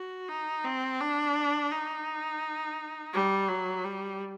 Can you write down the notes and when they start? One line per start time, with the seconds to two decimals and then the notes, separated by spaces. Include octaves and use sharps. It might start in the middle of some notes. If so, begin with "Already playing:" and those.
Already playing: F#4
0.28 D#4
0.64 C4
1.00 D4
1.71 D#4
3.13 G3
3.48 F#3
3.84 G3